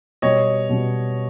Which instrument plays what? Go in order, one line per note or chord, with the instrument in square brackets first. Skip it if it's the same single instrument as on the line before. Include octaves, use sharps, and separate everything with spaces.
[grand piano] B2 G3 B3 [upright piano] C#5 D#5
[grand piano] B2 G3 B3